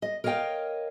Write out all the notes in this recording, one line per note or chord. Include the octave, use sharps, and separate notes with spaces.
D#5
A#4 C#5 D#5 F5 G5